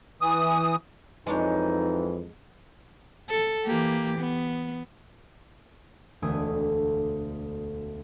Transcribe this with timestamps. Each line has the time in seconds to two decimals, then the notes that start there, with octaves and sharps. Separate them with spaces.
0.21 E3 D#6
1.27 F2 E3 G#3 D4 D#4 C#5
3.29 A4
3.66 E3 A#3 G4
4.19 B3
6.22 E1 D2 A3 G#5 D#6